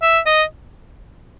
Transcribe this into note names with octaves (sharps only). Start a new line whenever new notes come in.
E5
D#5